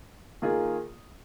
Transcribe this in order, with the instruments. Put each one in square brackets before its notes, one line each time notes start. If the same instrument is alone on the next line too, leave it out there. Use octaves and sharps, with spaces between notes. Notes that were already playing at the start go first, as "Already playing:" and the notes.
[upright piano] D#3 A#3 F4 G#4